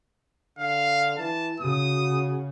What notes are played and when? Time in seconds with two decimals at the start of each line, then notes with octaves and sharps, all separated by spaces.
0.58 D3 F5
1.18 E3 A5
1.60 C#3 F#4 D#6